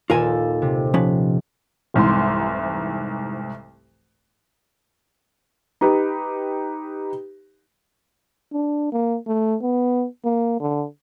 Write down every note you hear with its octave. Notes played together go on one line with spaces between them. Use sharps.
D#1 A#2 F4 A4 A#4 G#5
C3
F3 C#4 B4
F1 C2 G#2 E3 C6
D#4 G4 B4
D4
A#3
A3
B3
A#3
D3